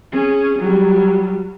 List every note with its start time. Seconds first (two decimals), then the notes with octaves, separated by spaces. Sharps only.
0.12 C#4 G#4
0.60 F#3 G3